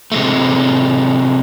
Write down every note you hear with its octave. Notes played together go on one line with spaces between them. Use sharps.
C3 G#3 A3